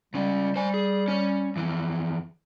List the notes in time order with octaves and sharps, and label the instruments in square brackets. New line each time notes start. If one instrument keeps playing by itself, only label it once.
[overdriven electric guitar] C#2 C#4 [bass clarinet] G3
[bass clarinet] G3 [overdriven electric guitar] C5 G#5
[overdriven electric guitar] G#4
C#4 C#5
F2 E3